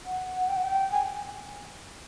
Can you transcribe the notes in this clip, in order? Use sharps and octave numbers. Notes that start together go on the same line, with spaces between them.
F#5
G5
F#5
G5
G#5